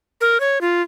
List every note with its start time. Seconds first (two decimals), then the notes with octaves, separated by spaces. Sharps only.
0.21 A#4
0.40 C#5
0.61 F4